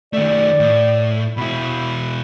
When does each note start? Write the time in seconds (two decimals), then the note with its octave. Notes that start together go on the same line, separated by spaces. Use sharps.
0.13 D#3 A3 D5
0.60 A2
1.37 B2 E4 B5